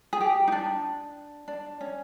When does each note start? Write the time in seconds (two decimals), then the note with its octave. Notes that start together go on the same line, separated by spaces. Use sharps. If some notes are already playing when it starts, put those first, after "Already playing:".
0.13 G#4
0.21 G4
0.48 D#4
0.52 D4
1.48 D4
1.81 C#4